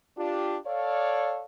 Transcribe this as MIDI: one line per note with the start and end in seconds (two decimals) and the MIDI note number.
0.18 0.57 62
0.18 0.57 65
0.18 0.57 67
0.66 1.45 69
0.66 1.45 73
0.66 1.45 74
0.66 1.45 77